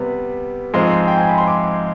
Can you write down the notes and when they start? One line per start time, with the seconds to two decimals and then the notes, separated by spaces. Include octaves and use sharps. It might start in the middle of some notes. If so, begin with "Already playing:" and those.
Already playing: C3 G3 B3
0.74 G#2 F3 G#3 C4 C6
1.08 G5
1.18 G#5
1.27 B5
1.38 C6
1.48 D6